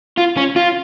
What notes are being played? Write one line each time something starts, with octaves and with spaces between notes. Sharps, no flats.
F4
C#4
F4